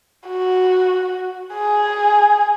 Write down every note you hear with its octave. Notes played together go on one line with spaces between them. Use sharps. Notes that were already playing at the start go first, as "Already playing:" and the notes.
F#4
G#4